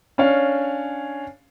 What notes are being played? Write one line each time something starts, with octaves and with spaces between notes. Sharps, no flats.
C#4 D4 C#5 F5